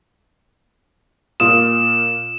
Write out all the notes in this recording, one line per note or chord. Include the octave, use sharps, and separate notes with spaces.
A#2 F4 D#6 E7